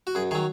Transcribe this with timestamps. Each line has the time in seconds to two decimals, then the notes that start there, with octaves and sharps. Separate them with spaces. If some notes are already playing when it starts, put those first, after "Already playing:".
0.07 F#4
0.15 F#2 G#4
0.31 D#3 G#4
0.35 F#3